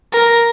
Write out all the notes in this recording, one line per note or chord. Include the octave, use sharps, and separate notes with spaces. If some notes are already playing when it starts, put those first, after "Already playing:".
A#4